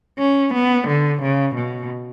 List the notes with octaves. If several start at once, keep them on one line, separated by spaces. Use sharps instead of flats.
C#4
B3
D3
C#3
B2